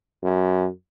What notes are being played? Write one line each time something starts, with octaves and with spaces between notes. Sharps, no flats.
F#2